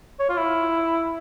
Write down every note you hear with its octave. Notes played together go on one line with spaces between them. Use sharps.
C#5
F4
E4